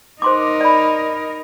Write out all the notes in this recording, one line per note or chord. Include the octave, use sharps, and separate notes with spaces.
D#4 A#4 C5 C6 D6
D5 B5